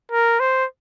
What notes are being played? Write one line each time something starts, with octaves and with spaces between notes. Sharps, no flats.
A#4
C5